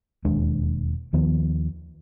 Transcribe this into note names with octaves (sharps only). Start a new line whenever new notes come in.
E1 D#2 G#3 D4
D#2 D#3 F3 B3